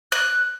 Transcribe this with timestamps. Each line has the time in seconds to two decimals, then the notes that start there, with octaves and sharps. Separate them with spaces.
0.12 F#6